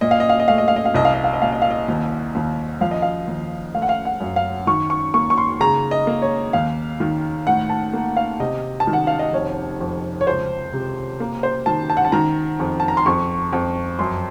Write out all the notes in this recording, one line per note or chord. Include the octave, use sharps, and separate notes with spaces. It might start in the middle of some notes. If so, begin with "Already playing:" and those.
A#2 D#5
F5
D#5
F5
D#5
A3 F5
D#5
F5
D#5
F5
C2 D#5
F5
D#5
F5
D#5
A#2 F5
D#5
F5
D#5
D#2
D#2
F3 F5
D#5
F5
D#2
A3 F5
F#5
F5
F#5
F#2
F5
D#3 C#6
C#6
A#3 C#6
C#6
C6
C#3 A#5
D#5
A#3
C#5
D#2 F5
D#3
A2 F#5
A5
A#3
F5
C3 D#5
A5
D#3
F#5
F5
D#5
F1 C#5
F2
C#5
C#2 C5
C3
A#3
C5
D#3 A5
A5
F#5
A5
D#3 A#5
F2
A5
A#5
C6
F2 C#6
F2
F#2 C6